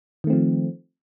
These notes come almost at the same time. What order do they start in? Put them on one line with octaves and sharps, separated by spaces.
D#3 A3 C4 F3